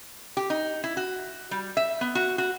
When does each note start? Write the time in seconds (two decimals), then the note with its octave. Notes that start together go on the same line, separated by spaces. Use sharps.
0.37 G4
0.50 D#4
0.84 E4
0.97 F#4
1.51 G3
1.77 E5
2.01 B3
2.15 F#4
2.38 F#4